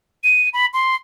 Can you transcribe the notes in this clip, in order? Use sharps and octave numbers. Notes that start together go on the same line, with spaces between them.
D#7
B5
C6